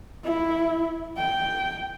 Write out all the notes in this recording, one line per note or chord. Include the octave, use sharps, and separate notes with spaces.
E4
G5